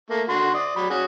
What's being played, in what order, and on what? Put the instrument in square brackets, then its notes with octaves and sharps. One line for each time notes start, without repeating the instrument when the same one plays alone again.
[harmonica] A3 A#3
D3 F#4 C6
D5 D#6
F#3 D5 B5
C#4 F#4 G#4